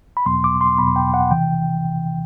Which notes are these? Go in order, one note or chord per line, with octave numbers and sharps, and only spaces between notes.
B5
E2 B2 F#3 B3 C6
D6
C6
E2 B2 F#3 B3 B5
G5
F#5
C3 E3 G5